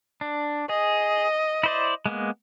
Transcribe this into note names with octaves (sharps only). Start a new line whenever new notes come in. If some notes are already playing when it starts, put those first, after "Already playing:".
D4
G#4 D#5
E4 C5 D5
G#3 A#3 B3